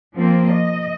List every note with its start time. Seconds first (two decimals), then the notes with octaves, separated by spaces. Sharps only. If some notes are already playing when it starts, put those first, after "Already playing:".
0.14 F3 A#3 C4
0.49 D#5